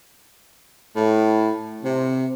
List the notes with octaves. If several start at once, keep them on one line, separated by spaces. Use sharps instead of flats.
A2
C3